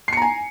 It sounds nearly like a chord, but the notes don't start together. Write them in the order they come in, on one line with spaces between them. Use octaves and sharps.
C7 C#7 A#5 G#5